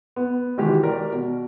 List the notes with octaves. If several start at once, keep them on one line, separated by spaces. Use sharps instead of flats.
B3
C3 D#3 E3 G#3 F#4 G4
A#4 D5
B2